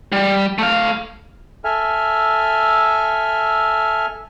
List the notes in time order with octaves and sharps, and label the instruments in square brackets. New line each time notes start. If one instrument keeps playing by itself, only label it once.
[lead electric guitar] G3
A3 F5
[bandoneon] A4 E5 G#5 F6